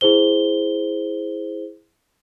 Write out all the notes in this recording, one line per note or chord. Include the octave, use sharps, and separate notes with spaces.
E4 G#4 C5 G7